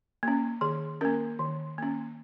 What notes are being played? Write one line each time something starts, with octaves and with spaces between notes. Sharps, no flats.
A#3 C#4
D#3 G#4
A#3 C#4 A#4
D#3
A#3 C#4